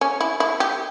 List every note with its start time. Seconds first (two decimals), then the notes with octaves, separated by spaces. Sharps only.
0.01 C#4
0.21 E4
0.40 E4
0.60 G4